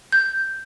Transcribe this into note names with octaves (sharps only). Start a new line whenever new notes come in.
G6